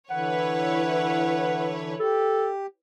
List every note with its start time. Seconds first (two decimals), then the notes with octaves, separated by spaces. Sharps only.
0.11 D3 E3 E4 B4 C#5 F#5
2.00 G4 A4